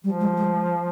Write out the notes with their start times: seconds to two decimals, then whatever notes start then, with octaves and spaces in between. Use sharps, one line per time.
0.04 F3 G3
0.21 G#3
0.37 G#3